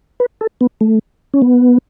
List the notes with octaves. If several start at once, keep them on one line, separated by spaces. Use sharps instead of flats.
B4
A4
B3
A3
C#4
B3